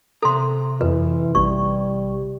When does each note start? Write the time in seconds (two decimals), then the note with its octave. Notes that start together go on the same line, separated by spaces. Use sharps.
0.23 C3 A4 A#5 C6
0.81 F2 E3 B4
1.35 A1 G3 C#6